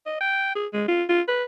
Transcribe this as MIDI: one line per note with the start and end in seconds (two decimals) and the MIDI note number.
0.06 0.20 75
0.21 0.55 79
0.55 0.67 68
0.73 0.87 56
0.88 1.04 65
1.09 1.21 65
1.28 1.44 71